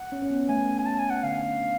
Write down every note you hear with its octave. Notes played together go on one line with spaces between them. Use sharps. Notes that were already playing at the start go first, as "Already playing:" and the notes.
Already playing: F#5
C#4
C#4
B3
A3 G#5
G#5
A5
G#5
F#5
D3 F5